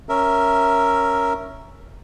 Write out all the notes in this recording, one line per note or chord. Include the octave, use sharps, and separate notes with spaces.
C#4 A#4 E5